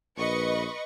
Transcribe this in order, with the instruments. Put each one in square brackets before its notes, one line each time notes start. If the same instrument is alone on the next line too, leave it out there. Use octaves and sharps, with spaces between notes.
[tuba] A#1 [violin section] B4 D#5 C#6